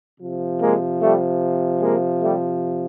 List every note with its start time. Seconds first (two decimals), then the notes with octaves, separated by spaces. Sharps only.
0.20 C3 F3
0.61 G#3 A#3
1.00 G3 A3
1.81 G#3 A#3
2.21 G3 A3